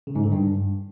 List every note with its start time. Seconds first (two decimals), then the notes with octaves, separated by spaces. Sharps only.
0.07 C#3
0.15 G#2
0.24 D3
0.32 G2